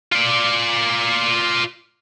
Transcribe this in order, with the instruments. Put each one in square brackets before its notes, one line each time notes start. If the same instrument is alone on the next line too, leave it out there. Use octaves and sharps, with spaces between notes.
[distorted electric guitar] F4 D5